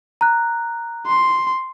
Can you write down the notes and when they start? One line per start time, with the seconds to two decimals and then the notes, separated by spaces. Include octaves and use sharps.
0.21 A#5 F#6
1.07 C6